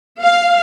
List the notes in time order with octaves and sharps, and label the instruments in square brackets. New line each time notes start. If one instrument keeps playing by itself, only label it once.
[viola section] F5